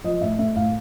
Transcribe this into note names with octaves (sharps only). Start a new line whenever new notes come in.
F3 D#5
A2 E5
A3 E5
A2 F5